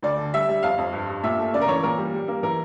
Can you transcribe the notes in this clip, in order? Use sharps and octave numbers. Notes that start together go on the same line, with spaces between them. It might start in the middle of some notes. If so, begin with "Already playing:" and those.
D2 D5
D3
G3 E5
G3
F2 F5
F2
G2
G2
A#2 E5
A3
C#3 D5
A#4
E3 C#5
A#2 A#4
G3
G3
A#3
E3 A#4